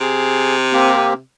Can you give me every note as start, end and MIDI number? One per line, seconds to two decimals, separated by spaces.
0.01 1.20 48
0.01 0.56 68
0.73 1.13 58
0.73 1.13 60
0.73 1.13 67